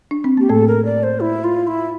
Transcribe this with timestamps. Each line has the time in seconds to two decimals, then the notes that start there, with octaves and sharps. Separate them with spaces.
0.11 D4
0.24 C4
0.37 A#3 G4
0.49 A2 A3 A4
0.67 A#4
0.85 D5
1.03 C5
1.20 E4
1.44 F4
1.67 E4